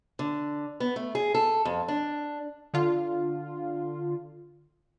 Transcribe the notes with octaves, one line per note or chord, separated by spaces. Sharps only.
D3
B3
A3
G#4
A4
F2
D4
D3 F4